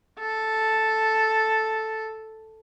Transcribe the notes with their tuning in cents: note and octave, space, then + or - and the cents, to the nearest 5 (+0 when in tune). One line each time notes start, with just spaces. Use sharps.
A4 +0